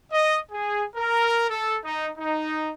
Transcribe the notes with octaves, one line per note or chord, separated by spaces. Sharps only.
D#5
G#4
A#4
A4
D#4
D#4